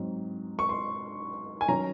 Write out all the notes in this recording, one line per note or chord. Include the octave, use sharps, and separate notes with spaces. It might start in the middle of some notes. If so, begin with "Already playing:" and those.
Already playing: G#2 F#3 C4 D#4
C#6
C6
G#5
D#3 F#3 C#4 A#5